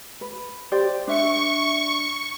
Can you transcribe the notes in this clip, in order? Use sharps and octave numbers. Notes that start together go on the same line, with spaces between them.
B4
G4 C5 D5
D4 E5 C#6